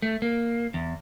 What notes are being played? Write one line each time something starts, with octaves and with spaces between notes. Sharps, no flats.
A3
A#3
E2